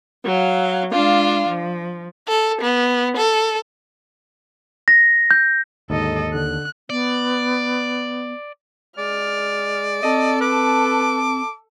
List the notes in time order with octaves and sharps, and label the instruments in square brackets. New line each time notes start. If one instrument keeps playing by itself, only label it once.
[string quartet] F#3 F5
G#3 D4 F4 F5
F3
[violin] A4
B3
A4
[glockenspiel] A#6
G6
[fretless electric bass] D#2 [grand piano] G#2 D3 [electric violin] A4 D#5
[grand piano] D3 [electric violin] F#6
[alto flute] B3 [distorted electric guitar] D5
[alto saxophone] G#3 [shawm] D5 [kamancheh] F6
[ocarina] C4 [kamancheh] A4 A5 [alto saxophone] D#5
[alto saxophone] B4 [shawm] D6